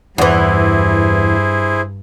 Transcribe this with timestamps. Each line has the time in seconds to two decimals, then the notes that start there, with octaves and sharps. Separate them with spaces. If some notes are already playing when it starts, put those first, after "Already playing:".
0.18 E2 G2 E3 E4 G#4 C5